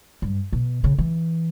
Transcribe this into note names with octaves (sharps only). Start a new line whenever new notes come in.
G2
B2
C#3
E3